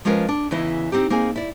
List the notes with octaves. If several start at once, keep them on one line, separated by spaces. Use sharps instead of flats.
F3 G#3 C#4 F4 A#4 B4
D4
E2 C#3 E3 E4 D#5
C4 D#4 G4
A#3 C4 D#4 G#4 G#5
E4 D5